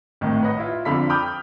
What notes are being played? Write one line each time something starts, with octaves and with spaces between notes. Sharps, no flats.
G#1 A2 D#3
B4 C#5 D#5 F#5
E4 F4
F2 D3 F5 B5 B6
G5 B5 D6 D#6 F6 G6